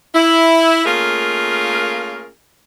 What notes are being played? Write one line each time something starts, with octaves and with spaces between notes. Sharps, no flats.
E4
A3 A#3 C#4 F4 G#4 A#4